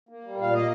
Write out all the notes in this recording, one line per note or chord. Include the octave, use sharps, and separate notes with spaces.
A#3
G3
A#2 F5
A#3 D#5